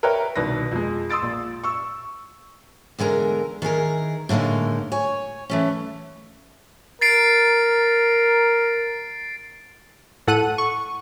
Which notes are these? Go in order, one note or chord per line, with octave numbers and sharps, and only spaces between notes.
A#4 B4 C#5 E5 G5 A#5
C2 B2 D#3 B4 A#6
F2 G#3
C6 D#6 E6 A6 D7
A#1
C#6 E6
E2 D3 G#3 A#4 A#5
D#3 E3 G#4 A#4
A2 D3 G#3 A#3 D#4
C#5 G#5
E3 A3 C#4
A#4 A6 C7 D7
A2 A4 F#5 F#6 D#7
C#6